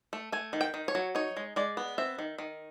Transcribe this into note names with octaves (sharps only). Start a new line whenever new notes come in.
A3
A3 G#5
D#3
G5
D#3
C#5
F#3
D#4 C#5
G#3
G#3 D5
B3
C4 E5
D#3
D#3